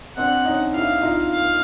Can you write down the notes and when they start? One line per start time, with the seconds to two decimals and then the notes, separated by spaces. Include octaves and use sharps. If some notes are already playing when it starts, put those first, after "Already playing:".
0.17 C4 D4 F#5
0.45 C#4 D#4
0.74 D4 E4 F5
1.02 D#4 F4
1.31 F5